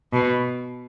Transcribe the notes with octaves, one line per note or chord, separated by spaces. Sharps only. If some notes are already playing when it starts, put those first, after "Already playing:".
B2